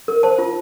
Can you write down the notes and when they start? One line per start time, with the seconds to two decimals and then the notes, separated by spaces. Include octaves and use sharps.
0.08 A#4
0.23 C5 A5
0.39 F4